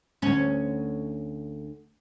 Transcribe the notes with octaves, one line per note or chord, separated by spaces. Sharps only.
D2 C#4